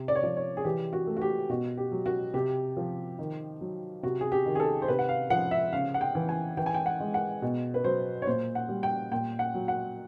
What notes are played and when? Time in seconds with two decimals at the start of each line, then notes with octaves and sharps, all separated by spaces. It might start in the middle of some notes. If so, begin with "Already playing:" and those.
Already playing: C3
0.08 D5
0.15 C#5
0.22 F3 D5
0.37 C#5
0.57 G#4
0.65 E3 G4
0.93 F#4
1.07 A3
1.17 F#4
1.21 G4
1.50 B2 F#4
1.78 G4
1.92 F#3
2.06 F#4
2.34 C3 G4
2.77 F3
3.19 D#3
3.61 F#3
4.03 C3 F#4
4.21 G#4
4.32 G4
4.46 D#3
4.55 G#4
4.60 A4
4.82 C5
4.88 C3 B4
4.99 F#5
5.09 F5
5.30 F3 F#5
5.51 E5
5.73 C#3 F5
5.94 F#5
6.01 G5
6.15 E3
6.29 G#5
6.57 E3 G5
6.66 G#5
6.74 G5
6.86 F#5
7.00 G#3
7.14 F#5
7.42 B2
7.74 B4
7.84 F#3 C5
8.22 C#5
8.27 A#2 C5
8.55 F#5
8.69 G3
8.83 G5
9.12 A#2 G5
9.39 F#5
9.54 F#3
9.68 F#5